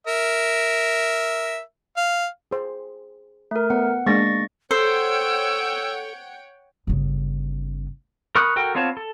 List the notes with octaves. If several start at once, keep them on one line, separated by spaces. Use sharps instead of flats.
A#4 E5
F5
G#4 C5
A3 A#4
B3 F#5
G#3 A#3 D4 C#6 A6 A#6
A4 C5 C#5 F#5 G5 E6
G1 C#3
A#4 B5 C#6 D#6 F#6
F#4 A4 A#4 G5
B3 C4 F4 C#5 A5
A4